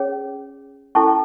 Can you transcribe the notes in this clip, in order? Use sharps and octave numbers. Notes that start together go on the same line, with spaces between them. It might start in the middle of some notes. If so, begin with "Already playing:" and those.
Already playing: C#4 G#4 C#5
C#4 E4 A4 A5 C#6